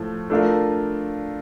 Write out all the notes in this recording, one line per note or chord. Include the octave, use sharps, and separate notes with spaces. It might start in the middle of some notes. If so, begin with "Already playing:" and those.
Already playing: A2 F3 A3
A3 D4 F4 A#4